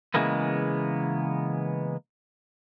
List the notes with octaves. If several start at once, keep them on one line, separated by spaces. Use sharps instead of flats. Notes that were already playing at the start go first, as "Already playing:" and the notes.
C#3 E3 G#3 A#3 B3